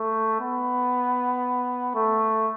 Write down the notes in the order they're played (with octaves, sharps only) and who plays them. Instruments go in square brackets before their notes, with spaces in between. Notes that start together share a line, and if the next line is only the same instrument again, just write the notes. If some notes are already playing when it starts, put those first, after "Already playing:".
Already playing: [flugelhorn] A3
B3
A3